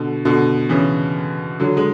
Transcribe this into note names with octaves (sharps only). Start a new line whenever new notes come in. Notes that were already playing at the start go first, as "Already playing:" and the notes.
Already playing: B2 D3
B2 D3
C#3 E3
D3 F#3
G#3